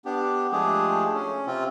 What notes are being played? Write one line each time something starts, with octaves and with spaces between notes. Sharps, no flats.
B3 D4 G4
F3 G#3 A3 D4 G4 G#4
C#4
C3 C4 F4